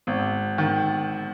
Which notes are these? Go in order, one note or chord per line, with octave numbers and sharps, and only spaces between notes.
G#1
D#3